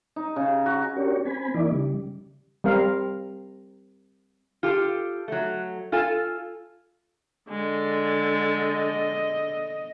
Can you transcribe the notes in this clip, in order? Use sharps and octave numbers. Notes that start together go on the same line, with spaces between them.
D#4
C#3
F#4
C#4 D4 F#4 G4 A#4 C#5
C4 G#5 B5
E3 A#3 D#4 E4 D5
C#3 G3
G3 C4 A#4 F5
F4 G4 A4
F#3 A3
F4 A4 G#5
D3 G#3
D#5